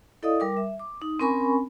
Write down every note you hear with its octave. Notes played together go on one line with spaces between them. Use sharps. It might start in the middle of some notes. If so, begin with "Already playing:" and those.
E4 A4 D5 D#5 F5 D#6
G3 A#4 D6
E5
D6
D#4
C4 C#4 A#4 G#5 B5 C#6